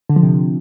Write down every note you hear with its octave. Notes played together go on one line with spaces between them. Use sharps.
D3
F3
C3